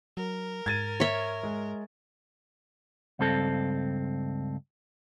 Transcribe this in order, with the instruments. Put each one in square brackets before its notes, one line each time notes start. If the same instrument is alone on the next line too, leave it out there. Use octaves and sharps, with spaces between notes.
[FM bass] F#3 [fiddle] A#4
[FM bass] G#2 [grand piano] G#6 A6 D#7
[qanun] C#5 E5
[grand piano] G#3
[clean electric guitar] C#2 G2 C4 A4